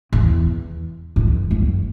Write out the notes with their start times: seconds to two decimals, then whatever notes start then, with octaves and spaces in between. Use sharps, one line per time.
0.13 E2
1.16 F#2
1.51 F#2